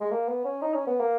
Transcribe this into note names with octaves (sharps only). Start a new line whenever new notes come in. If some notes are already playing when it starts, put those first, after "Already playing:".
G#3
A#3
B3
C#4
D#4
C#4
B3
A#3